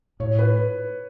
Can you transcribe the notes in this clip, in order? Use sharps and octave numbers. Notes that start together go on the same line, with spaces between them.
A2 C#5
B4